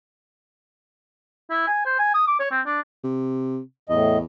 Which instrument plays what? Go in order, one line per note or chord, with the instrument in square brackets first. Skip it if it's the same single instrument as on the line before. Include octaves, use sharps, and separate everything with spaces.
[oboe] E4
G#5
C5
G#5
D#6
D6
C#5
C4
D4
[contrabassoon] C3
[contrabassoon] E2 [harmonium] A2 D#5